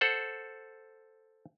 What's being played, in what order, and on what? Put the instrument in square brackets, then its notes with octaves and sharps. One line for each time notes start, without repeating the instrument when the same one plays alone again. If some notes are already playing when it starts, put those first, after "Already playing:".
[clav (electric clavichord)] A4 C5 F#5